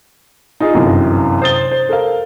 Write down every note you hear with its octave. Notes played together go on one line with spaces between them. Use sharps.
D#4 F4 G#4
G1 F#2 C3 E3
C5 D#6 A6 G7
C5
A4 A#4 F5